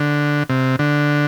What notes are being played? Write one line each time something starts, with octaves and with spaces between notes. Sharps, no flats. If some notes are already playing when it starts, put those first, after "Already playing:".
Already playing: D3
C3
D3